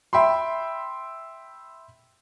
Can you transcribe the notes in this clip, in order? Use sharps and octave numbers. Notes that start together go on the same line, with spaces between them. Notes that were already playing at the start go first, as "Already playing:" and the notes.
E5 G5 B5 C6